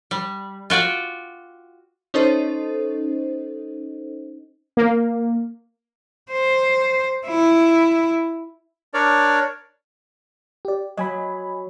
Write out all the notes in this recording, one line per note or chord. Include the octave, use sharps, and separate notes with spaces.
G3
F4 F#4 D5 G5
C#4 D#4 A4 C5 D#5
A#3
C5
E4
D4 A#4 C#5 D5
G4 D5
F#3 D#5 G#5 B5